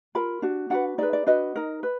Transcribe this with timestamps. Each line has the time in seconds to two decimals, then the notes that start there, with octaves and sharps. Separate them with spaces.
0.15 F4 A#4 B5
0.42 D4 F#4
0.70 D4 F#4 B4 F#5
0.98 D#4 G#4 B4 D5
1.13 D5
1.26 D4 F#4 B4 D#5
1.56 D#4 A#4
1.83 B4